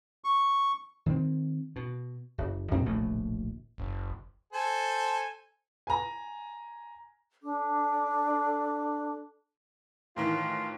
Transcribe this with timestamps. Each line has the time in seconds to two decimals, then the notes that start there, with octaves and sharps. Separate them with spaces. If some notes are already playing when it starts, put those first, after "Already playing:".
0.24 C#6
1.06 D#3 C4
1.76 B2
2.38 F#1
2.71 F2 A#2 D3 C4
2.86 D1 A#1 B2 A3
3.78 F#1
4.53 A4 C5 G#5
5.87 G#5 A#5
7.41 D4 A4 D6
10.16 A2 D#3 E3 F4